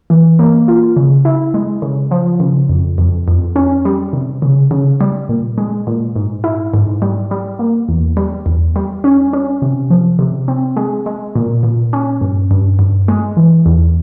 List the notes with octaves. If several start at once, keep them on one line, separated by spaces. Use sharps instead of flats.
E3
A#3
F4
C#3
E4
G#3
C#3
F3
C#3
F2
F2
F2
C#4
G3
C3
C#3
C#3
G3
A#2
G#3
A#2
G#2
E4
G#2
G3
G3
A#3
E2
G3
E2
G3
C#4
C#4
C3
F3
C3
C4
G#3
G#3
A#2
A#2
C#4
G2
G2
G2
G#3
E3
E2